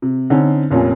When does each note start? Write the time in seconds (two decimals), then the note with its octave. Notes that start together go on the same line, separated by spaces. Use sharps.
0.02 C3
0.30 D3 C4 C#4 D#4
0.70 F1 F2 A#2 C#4